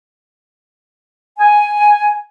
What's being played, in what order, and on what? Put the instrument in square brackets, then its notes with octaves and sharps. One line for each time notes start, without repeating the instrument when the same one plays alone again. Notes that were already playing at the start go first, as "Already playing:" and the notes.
[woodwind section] G#5